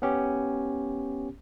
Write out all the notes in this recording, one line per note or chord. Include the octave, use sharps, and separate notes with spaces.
B3 C#4 G4